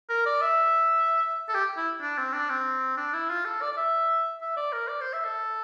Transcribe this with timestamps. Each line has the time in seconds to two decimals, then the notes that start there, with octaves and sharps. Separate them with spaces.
0.09 A#4
0.26 D5
0.42 E5
1.49 A4
1.54 G4
1.77 E4
2.01 D4
2.18 C4
2.33 D4
2.50 C4
2.97 D4
3.13 E4
3.30 F4
3.45 A4
3.62 D5
3.72 D5
3.77 E5
4.42 E5
4.57 D5
4.73 A#4
4.88 D5
5.01 C5
5.13 E5
5.25 A4